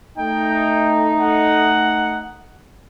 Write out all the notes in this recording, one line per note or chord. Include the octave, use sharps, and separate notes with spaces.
A3 D#4 G5
F#5